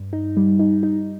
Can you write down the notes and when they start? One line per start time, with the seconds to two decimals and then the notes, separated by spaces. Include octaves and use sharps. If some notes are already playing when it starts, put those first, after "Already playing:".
Already playing: G2
0.13 D#4
0.37 G3
0.59 D#4
0.83 D#4